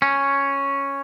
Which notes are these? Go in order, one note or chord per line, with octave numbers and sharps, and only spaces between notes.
C#4